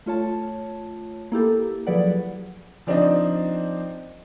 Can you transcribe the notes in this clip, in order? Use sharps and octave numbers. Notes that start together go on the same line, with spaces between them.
A3 F4 C#5 A5
A#3 E4 G4 A4
F3 F#3 G#4 B4 D5 F#5
F3 C4 D4 D#4 C5 D#5